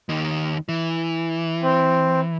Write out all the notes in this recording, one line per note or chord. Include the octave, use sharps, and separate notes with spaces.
D#2 D#3
E3
C4